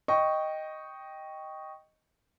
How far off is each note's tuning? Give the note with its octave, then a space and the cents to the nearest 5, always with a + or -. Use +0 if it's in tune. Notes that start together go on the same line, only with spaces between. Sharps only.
D#5 +0 G5 -5 C#6 +0